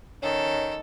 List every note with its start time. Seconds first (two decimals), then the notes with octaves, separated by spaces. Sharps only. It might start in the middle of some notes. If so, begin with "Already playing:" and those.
0.23 D#3 C#4 A4